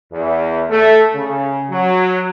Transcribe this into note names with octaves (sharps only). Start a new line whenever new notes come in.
E2
A3
C#3
F#3